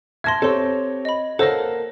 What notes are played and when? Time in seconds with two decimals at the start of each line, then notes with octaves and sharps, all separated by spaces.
0.24 E5 A5 C6 G#6 A#6
0.42 C4 G4 A4 C5 C#5 C6 E6
1.05 D#5 B5
1.39 A#3 A4 C5 C#5 F#5 E6 A#6